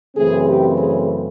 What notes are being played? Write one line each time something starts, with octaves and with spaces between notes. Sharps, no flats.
F#2 C#3 E3 A3 C4 G#4
G4
G#4